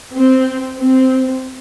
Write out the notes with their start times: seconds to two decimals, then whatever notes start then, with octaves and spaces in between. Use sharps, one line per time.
0.16 C4
0.81 C4